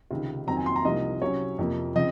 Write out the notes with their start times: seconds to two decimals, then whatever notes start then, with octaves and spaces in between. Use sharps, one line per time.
0.11 C#2 C3 D#3
0.47 F2 D#3 F#3 C4 A#5
0.57 G#5
0.66 C6
0.76 A#5
0.85 C2 C3 F3 A#3 D#4 D#5
1.22 C3 F#3 C#4 C#5
1.59 F2 C3 F3 A#3
1.96 C#3 F3 C4 D#5